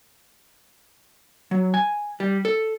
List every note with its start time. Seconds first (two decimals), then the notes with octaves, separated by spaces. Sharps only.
1.51 F#3
1.74 G#5
2.20 G3
2.45 A4